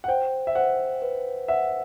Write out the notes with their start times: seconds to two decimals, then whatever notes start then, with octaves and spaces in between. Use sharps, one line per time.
0.04 F#5
0.08 C5 G5
0.47 E5
0.55 C5 F#5
1.02 B4
1.48 E5 F#5